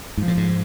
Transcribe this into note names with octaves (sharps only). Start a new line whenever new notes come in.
G#2 F3
A2
G#2